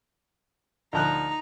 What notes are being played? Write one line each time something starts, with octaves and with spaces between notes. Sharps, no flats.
D2 F3 D#4 A#5 F#6